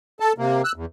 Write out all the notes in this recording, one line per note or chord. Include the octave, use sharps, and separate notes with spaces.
A4 A5
C3 A#3
E6 F#6
E2